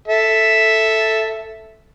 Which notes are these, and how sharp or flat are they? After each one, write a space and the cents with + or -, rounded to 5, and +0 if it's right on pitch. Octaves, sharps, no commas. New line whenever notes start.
A4 +0 E5 +0